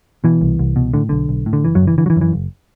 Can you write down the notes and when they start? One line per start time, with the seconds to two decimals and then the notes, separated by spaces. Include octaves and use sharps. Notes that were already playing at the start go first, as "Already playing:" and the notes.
0.24 B2 E3
0.41 C2
0.59 C2
0.76 B2
0.94 A2 D3
1.09 B1 D3
1.29 B1
1.46 A2
1.53 D3
1.64 F#1 E3
1.75 F#2 F#3
1.81 F#1
1.87 E3
1.98 D3 E3
2.06 F#3
2.10 E3
2.16 F#2
2.21 E3
2.33 F#1